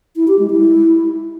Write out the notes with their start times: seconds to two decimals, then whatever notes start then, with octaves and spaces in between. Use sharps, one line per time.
0.16 E4
0.28 G4
0.39 G#3
0.50 E4